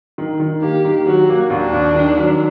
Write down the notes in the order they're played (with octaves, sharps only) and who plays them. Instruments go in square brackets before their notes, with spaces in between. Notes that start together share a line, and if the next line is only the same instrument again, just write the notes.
[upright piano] D#3
D#3
[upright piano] A#3 [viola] G4
[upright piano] D#3
[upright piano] F#3 [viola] F#4
[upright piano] A#3
[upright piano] D#2 [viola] D4
[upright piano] D#2
D#3
F#3